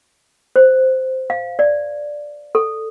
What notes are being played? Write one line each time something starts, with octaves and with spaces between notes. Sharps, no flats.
C5
F5
D5
A4